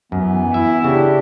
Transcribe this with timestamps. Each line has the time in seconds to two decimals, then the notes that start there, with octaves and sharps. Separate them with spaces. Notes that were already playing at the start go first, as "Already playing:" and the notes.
0.12 F#2 E3 B3
0.54 E4 E5
0.84 C#3 D4 G4